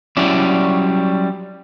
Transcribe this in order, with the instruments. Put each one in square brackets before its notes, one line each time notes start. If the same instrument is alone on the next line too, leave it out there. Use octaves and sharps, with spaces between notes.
[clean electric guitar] F#3 G3 C#4 E4 D5